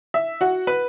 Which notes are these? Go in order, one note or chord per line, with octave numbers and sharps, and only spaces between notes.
E5
F#4 F#5
B4 B5